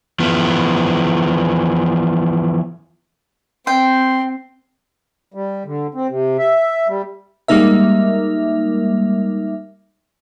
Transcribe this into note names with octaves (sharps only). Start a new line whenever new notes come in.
E3 F3 B3
C4 G5 C6
G3
D3
C4
C3
E5
G3
G3 G#3 A#3 D#4 A#4 E5